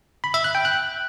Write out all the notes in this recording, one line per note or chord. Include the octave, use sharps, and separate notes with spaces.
B5
E5
F#6
G5
F#6